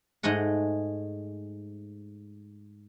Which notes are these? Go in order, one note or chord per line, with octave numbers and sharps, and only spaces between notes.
G#2 A3 G#4 D#5 F#5